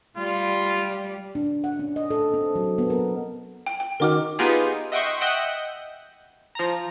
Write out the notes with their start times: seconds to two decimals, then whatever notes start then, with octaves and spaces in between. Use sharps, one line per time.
0.18 G3 F4
1.35 D4
1.64 F#5
1.79 C#4
1.96 D#5
2.10 A4
2.34 C4
2.55 F#3
2.78 B3
2.90 A#4
3.66 G5
3.80 G5
4.00 D#3 D#4 F#4 A#4 D6 F6
4.39 B3 D#4 F4 G4 G#4
4.92 D#5 E5 F#5 G5 C6 C#6
5.20 D#5 E5 F#5 G5 F#6 G6
6.55 F3 A#5